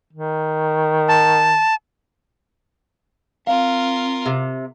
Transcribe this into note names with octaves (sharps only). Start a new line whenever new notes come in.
D#3
A5
C4 F4 A#4 F5
C3